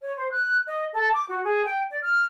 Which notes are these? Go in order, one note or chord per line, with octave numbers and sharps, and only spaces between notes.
C#5
C5
F#6
D#5
A4
D6
F#4
G#4
G5
D5
F6